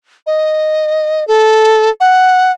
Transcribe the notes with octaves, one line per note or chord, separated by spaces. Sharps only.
D#5
A4
F#5